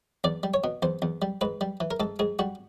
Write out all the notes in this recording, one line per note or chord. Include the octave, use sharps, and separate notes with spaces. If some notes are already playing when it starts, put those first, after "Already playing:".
E2 D5
G3
C#5
B2
E2 C5
E2
G3
G#2 B4
G3
E3
A#4
G#2 A4
G#2 G#4
G3 F#4